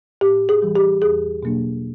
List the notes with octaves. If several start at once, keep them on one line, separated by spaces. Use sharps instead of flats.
A2 G4
G#4
E3 G3
G4
E2 G#4
B2 F#3 A#3 D4